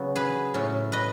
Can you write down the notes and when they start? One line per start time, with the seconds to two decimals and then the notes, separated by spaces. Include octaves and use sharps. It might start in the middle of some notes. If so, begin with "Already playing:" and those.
Already playing: C#3 F#3 B3
0.16 G#4 B4
0.54 A2 F#3 C#4
0.92 B4 D#5